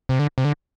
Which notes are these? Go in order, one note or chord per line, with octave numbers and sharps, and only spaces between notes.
C3
D3
C3
D3